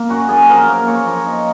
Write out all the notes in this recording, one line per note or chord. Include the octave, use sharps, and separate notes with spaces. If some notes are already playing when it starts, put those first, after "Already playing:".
Already playing: A#3
F#2 F#4
F#2 G#4
F3 A#4
A#3
A#3 C#5
F3
D#4